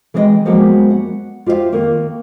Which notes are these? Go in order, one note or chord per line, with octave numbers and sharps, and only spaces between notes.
E3 G#3 B3 B4 D#5 G5
F3 F#3 G#3 A#3 B3 G4
F#5
F4 G4 C5 D#5 F5
D#3 A#3